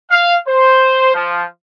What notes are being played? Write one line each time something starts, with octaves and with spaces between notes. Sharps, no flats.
F5
C5
F3